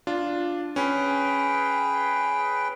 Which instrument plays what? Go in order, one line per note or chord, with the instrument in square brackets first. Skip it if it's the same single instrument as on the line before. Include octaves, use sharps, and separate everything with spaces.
[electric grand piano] D4 F4
[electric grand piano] C#4 [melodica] G#4 B4 G5